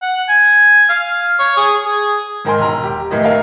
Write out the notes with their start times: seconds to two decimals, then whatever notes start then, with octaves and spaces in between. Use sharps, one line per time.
0.02 F#5
0.29 G#5
0.89 F5
1.39 C#5
1.57 G#4
1.85 G#4
2.45 G#2 D#3 A#4 G#5 C6
2.58 E1 A#5
2.84 G4
3.11 A2 D#3 E3 D#5
3.23 A3 A#4 F5